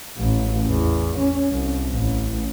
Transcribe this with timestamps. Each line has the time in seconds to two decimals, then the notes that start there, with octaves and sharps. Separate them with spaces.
0.17 A1
0.65 E2
1.17 C#4
1.51 C2
1.90 A1